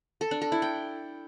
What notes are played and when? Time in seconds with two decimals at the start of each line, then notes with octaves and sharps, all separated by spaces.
0.21 A4
0.31 D4
0.41 A4
0.52 E4
0.62 G5